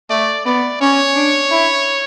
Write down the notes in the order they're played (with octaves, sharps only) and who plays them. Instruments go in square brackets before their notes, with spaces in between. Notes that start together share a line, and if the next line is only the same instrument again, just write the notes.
[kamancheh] A3 [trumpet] D5
[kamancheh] B3 [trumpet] D5
[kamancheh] C#4 [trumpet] C#5
[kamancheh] D4
E4